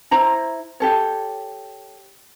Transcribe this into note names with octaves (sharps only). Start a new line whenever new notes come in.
E4 C5 A#5 B5
G4 A4 C#5